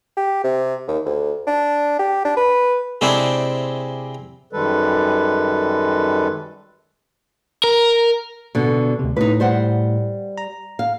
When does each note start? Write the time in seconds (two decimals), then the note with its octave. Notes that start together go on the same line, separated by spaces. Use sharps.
0.17 G4
0.44 C3
0.88 D#2
1.05 D2
1.47 D4
1.99 G4
2.25 D4
2.37 B4
3.01 C3 G#3 C4 D4 E4
4.53 F#2 D#3 G3 G#3 A4 B4
7.64 A#4
8.55 B2 D3
8.99 D2 C3
9.16 A2 D#4 B4
9.40 G3 C5 F#5
10.38 A#5
10.79 F5